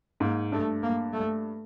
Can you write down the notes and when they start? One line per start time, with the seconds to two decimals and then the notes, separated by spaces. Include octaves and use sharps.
0.20 G#2 A#3
0.52 G2 A3
0.83 A#3
1.13 A3